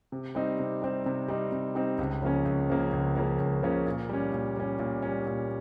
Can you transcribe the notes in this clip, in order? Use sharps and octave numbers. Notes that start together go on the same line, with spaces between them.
C3
G3 C4 D#4
C3
G3 C4 D#4
C3
G3 C4 D#4
C3
G3 C4 D#4
C#2
C#3 F3 A#3 C#4
C#2
C#3 F3 A#3 C#4
C#2
C#3 F3 A#3 C#4
C#2
C#3 F3 A#3 C#4
A#2
G3 C#4
A#2
G3 C#4
A#2
G3 C#4
A#2